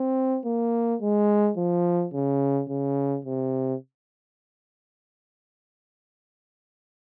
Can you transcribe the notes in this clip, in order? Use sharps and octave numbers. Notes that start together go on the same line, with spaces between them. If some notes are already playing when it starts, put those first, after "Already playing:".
Already playing: C4
A#3
G#3
F3
C#3
C#3
C3